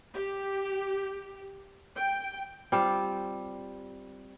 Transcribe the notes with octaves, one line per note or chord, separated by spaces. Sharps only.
G4
G5
G3 C4 F4